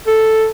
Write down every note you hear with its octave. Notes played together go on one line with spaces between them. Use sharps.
A4